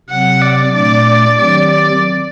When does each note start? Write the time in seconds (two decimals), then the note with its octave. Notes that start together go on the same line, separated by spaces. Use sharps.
0.09 C3 F#3 C4 F#5
0.42 D5
0.73 A#2 A3 D4 D5
1.38 D#3 F#3 C4 G4 D5
1.70 D5